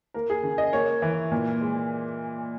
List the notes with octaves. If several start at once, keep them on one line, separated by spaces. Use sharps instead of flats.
A#3 A#4
G#4
C#3
D#5
A#3 C#5
E3
A#2
G#3